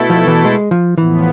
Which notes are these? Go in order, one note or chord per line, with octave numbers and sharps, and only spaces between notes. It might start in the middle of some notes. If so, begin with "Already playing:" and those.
Already playing: B2 A3 E4 A4
F3
E3
G#3
F3
A2 E3 F3 B3